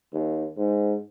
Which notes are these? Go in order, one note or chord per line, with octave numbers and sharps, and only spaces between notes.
D#2
G#2